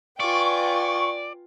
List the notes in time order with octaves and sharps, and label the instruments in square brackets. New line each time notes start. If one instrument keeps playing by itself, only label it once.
[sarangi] F4 [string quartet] B4 G5 G#5 [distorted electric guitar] D5 [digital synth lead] C#6